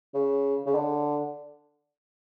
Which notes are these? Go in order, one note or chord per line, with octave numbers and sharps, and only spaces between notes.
C#3
C#3
D3